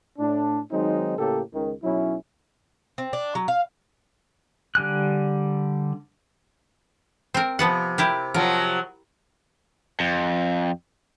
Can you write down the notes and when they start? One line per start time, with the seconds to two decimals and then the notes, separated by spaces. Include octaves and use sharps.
0.19 A2 D4
0.71 D#3 F#3 G#3 C4 D#4
1.18 A2 C#3 A#3 G4 A4
1.54 C#2 D#3
1.83 B1 F#3 C#4 E4
2.98 C4
3.13 D4
3.35 F#3
3.48 F5
4.75 D3 G3 G#5 F#6
7.34 C4 A#4
7.59 C3 F3 B3 F#5
7.98 E4 G4 A#4
8.34 C3 F3 F#3 A#4
10.00 F2